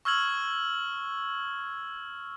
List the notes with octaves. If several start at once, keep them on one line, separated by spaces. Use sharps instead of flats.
C#6 E6 F6 G#6 F#7